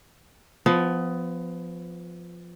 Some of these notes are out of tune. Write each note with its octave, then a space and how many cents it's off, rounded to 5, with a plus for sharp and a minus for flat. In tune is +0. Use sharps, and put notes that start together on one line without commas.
F3 +0 B3 +20